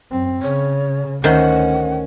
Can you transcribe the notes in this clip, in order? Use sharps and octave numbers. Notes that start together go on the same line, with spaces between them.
F#2 C4
C#3 C#5
D2 D#3 C#4 C5 F#5